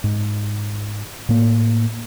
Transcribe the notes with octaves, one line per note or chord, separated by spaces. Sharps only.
G#2
A2 A#3